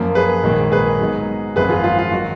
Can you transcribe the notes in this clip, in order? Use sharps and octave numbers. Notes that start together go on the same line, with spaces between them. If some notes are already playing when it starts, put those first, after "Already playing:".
Already playing: F#2 F3 A#3
G#4 B4
A#1 G#2 D#3 F#3 A#3
G#4 B4
G#2 F#3 B3 D#4
G#1 F#2 F3 A#3 G#4 B4
F4 G#4
F4
F4
D#3 F#3 F#4